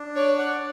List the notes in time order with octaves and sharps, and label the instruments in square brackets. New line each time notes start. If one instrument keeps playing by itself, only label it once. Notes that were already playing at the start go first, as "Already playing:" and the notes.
Already playing: [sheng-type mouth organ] D4
[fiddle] C#5 [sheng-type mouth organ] D5
[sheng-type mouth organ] F#5